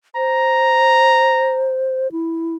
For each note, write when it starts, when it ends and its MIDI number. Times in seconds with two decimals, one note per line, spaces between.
0.16 2.11 72
0.16 1.75 82
2.12 2.56 64